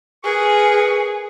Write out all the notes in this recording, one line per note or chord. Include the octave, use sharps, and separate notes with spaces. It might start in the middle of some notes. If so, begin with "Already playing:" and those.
G#4 A#4 B4 C#6